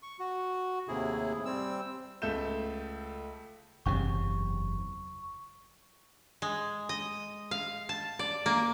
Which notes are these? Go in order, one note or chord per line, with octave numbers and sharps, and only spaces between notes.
C#6
F#4
D#2 A2 C3 E4 G#4
G3 C4 E6
C#2 A3 A4 E5 G6 E7
F#1 E2 C3 C#6
G#3
D#5
F5
A5
D5
A#3